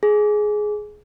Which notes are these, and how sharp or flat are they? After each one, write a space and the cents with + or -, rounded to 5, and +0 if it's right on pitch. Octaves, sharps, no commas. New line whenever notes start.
G#4 +15